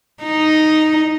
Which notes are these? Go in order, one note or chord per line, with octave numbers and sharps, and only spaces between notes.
D#4